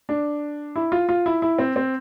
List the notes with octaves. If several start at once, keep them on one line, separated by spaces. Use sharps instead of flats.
D4
E4
F4
F4
E4
E4
C4
C4